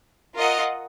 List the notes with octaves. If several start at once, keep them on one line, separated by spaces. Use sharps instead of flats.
F4 A#4 D#5 F#5